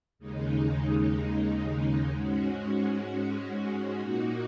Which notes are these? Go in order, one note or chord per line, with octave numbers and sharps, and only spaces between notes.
D#2 C#3 G#3 D#4
G#2 G#3 C#4 F#4
A#2 A#3 D#4 F#4